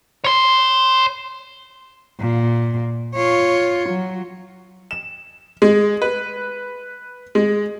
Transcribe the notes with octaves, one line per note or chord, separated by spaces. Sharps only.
C#5 C6
A#2
F4 C#5
F#3
E7
G#3
B4
G#3